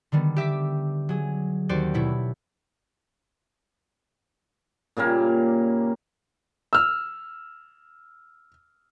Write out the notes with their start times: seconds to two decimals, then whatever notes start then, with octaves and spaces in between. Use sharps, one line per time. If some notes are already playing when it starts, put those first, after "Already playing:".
0.12 D3 D#3 G3 B3
0.36 G4 E5 D6 B6
1.09 F#3 G#4
1.69 D#2 C4 F#4 G4 C5 D5
1.94 B2 E4 C#5
4.97 A#2 C#3 G3 A#3
6.73 E6 F6